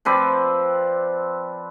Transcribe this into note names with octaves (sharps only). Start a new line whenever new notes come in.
F3 C4 B4 D5